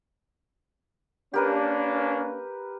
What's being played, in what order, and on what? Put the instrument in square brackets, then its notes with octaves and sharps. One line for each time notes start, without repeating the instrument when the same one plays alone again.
[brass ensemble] A#3 C#4 D4 [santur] G4 A#4 B4